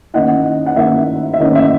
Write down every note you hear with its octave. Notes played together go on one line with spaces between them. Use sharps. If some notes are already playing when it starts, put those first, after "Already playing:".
D#3 A#3 C#4 E4 D#5 F#5
F#5
D#3 A#3 C#4 E4 E5
E5
D#3 A#3 C#4 E4 D#5
E5